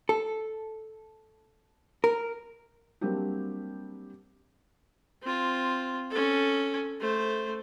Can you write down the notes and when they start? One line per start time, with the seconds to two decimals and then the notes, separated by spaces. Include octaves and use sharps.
0.09 A4
2.04 A#4
3.01 F#3 G3 A#3 C4 D4 G4
5.22 C4 F4
6.10 C#4 A4
7.00 A3 C5